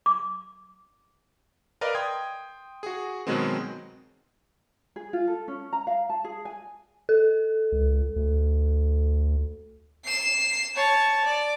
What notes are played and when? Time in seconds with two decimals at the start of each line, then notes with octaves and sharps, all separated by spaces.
0.06 D6
1.81 A#4 B4 D5 D#5 F5 B5
1.95 G5 C6 D#6 G#6
2.83 F#4 G#4
3.27 B2 D#3 F#3 G#3 B3 C4
4.96 G#4
5.13 F4
5.27 A4
5.48 C#4
5.73 A#5
5.87 F5
6.09 A5
6.24 G#4
6.45 G#5
7.09 A4
7.72 C#2
8.16 D2
10.04 C7 E7
10.76 C#5 A5
11.25 D5